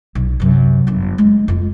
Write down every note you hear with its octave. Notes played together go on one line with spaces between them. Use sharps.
B1
F#2 C3
G1 F#2
G#3
F2 F4